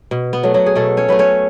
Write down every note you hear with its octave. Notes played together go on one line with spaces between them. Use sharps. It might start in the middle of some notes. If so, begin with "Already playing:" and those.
B2
B3
F#3 A3
F#3 F#4
G#4
B2 A3 A4
C#4 C#5
F#3 A3 B4
C#4 C#5